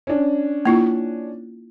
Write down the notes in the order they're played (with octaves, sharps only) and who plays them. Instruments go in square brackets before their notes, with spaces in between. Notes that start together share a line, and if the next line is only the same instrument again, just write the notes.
[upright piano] C#4 D4
[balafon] A#3 E4 F4